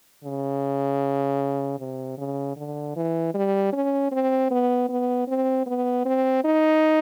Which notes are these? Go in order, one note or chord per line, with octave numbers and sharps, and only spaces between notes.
C#3
C3
C#3
D3
E3
G3
C#4
C4
B3
B3
C4
B3
C4
D#4